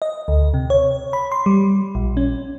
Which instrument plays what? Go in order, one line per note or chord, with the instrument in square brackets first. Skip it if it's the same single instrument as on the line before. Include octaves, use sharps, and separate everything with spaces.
[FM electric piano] D#5
D2
C3
C#5
B5
C6
G3
A#1
C#4